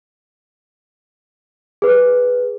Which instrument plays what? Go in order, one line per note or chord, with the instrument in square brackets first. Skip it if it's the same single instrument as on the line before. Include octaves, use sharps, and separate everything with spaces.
[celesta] G#4 B4